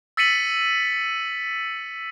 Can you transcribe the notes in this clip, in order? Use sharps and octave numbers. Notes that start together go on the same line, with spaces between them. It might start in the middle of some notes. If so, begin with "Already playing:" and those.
E6 A6 B6 C#7 D#7 F#7